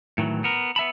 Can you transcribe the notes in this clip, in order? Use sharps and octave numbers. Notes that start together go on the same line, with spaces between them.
A2 D#3 E3 F#3
B3 A#4
B3 E5 A5 B5